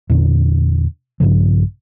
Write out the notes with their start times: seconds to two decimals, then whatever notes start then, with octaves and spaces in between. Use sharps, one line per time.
0.10 E2 A#2 D3
1.20 A#1 G2 C#3 F3